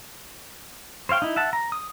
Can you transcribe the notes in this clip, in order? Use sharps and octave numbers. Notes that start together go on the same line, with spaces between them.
C5 C#5 F5 G5
D#4 E4
E5 F#5 A5
A#5
D#6